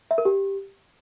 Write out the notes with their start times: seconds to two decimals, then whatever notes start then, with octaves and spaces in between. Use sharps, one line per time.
0.11 E5
0.18 A#4
0.25 G4